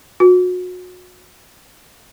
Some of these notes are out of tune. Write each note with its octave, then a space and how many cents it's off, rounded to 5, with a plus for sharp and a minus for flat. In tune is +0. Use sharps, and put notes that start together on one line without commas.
F#4 -30